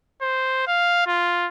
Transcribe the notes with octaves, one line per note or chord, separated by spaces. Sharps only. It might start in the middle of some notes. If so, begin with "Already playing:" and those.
C5
F5
F4